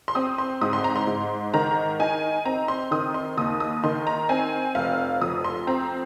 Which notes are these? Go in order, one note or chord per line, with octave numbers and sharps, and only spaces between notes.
C6
C4 D#6
C6
G#2 D#6
C6
A#5
C6
G#2
D#3 A#5
D#4 G#5
C4 A#5
C6
D#3 D#6
C6
D#2 D#6
D#6
D#3 C6
A#5
C4 G#5
F1 F5
F2 D#6
C6
C4 A#5